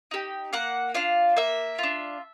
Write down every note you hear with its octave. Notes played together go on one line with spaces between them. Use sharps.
D#4 G4
A#3 F#5
D4 F4 F5
A#3 E5
D4 F4